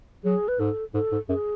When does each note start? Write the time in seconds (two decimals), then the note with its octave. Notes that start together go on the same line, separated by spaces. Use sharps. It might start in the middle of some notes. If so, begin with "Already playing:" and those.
0.24 F#3 G#4
0.48 B4
0.59 G#2 A4
0.94 G#2 A4
1.12 G#2
1.29 F#2 G#4